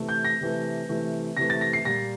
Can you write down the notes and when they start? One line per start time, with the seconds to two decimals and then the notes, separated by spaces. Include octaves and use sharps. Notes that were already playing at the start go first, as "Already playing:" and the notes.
Already playing: C3 E3 A3
0.09 G6
0.25 A#6
0.41 C3 E3 A3
0.89 C3 E3 A3
1.37 C3 E3 A3 A#6
1.50 A6
1.61 A#6
1.73 C7
1.85 A#2 G3 A#3 A#6